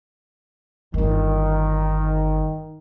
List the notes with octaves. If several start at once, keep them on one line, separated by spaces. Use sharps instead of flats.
D1 G1 D#3